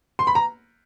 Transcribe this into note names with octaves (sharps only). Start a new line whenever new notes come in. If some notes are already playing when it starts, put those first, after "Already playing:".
C6
B5
A#5